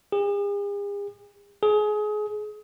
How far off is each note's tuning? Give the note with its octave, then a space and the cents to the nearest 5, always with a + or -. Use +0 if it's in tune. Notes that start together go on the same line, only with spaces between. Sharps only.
G#4 -45
G#4 +25